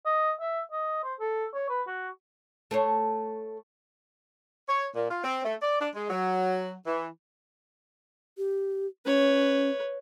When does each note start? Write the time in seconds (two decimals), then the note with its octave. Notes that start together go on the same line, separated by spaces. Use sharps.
0.06 D#5
0.41 E5
0.72 D#5
1.04 C5
1.20 A4
1.55 C#5
1.69 B4
1.87 F#4
2.71 A3 C5 C#5
4.69 C#5
4.96 A#2
5.11 F4
5.24 C4
5.44 A3
5.62 D5
5.80 D4
5.95 G#3
6.10 F#3
6.87 E3
8.38 G4
9.06 C#4 B4 C#5